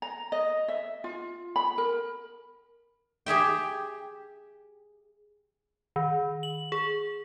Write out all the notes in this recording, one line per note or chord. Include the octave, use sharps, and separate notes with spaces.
A#5
D#5
E5
F4
B5
A#4
G4 G#4 E5 G5
D#3
F#7
G#4